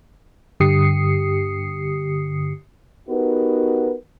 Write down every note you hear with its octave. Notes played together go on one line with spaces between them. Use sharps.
G2 D3 G4 D#6 C7 C#7
B3 D#4 F#4 G4 A#4 B4